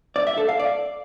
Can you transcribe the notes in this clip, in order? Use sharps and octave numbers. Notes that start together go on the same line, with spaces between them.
D5
E5
A4
F5
D5